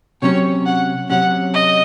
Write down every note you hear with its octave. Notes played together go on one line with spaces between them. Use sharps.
C3 F#3 C#4 C#5
F#5
C3 F#3 C#4 F#5
D#5